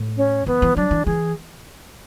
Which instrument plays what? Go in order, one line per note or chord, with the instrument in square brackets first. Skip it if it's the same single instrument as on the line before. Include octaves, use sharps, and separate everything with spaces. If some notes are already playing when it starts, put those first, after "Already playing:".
Already playing: [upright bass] A2
[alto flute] C#4
[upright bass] E3 [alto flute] B3
[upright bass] E3
[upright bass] F#3 [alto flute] D4
[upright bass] E3
[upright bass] E3 [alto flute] G#4